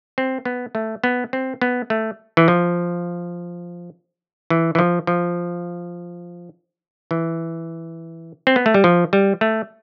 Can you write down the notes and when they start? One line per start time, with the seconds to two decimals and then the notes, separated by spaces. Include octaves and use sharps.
0.18 C4
0.45 B3
0.75 A3
1.04 B3
1.33 C4
1.62 B3
1.90 A3
2.37 E3
2.48 F3
4.50 E3
4.75 E3
4.79 F3
5.07 F3
7.11 E3
8.47 C4
8.56 B3
8.66 A3
8.74 G3
8.84 F3
9.13 G3
9.41 A3